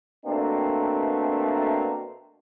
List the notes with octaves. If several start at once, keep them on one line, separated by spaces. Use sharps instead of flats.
B2 A3 A#3 C4 D4